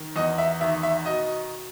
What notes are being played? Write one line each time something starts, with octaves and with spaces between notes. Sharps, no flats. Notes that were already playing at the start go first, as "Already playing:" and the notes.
Already playing: D#3
E2 D#5
E5
D#3 E5
E5
B2 D#5